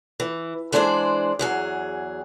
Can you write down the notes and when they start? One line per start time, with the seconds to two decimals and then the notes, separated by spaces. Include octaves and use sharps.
0.20 E3
0.72 E3 G#3 D4 G#4 C5 D5
1.39 E2 F#3 G#4